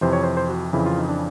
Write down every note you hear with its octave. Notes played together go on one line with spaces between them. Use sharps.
F2 C3 E3 C5
C#5
C5
C5
F#4
F2 C#3 E3 E4
F4
D#4
D4